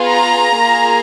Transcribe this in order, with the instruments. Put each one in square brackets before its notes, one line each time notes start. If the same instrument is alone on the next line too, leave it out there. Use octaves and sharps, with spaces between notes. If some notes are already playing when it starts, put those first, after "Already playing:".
Already playing: [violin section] B3 F4 G#4
A#5
A#3 F4 G#4